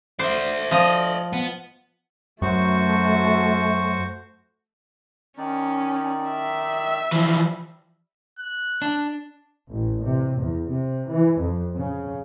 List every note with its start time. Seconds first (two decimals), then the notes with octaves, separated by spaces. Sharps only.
0.19 C5 D5 E5
0.71 F3 D#5
1.33 B3
2.42 F#2 A3 F#4 C5 C#6
5.38 D#3 C#4 D#4 D5
6.30 E5
7.12 E3 F3 G3
8.39 F#6
8.82 D4
9.70 A1
10.04 C3
10.39 E2
10.68 C3
11.10 E3
11.40 F2
11.77 C#3